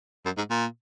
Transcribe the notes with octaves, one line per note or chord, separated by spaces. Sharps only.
F#2
G#2
A#2